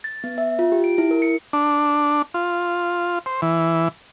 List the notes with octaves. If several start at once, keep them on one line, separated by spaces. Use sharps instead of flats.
A6
B3
E5
F4
G4
D7
E4
A#4
C#7
D4
F4
C5
E3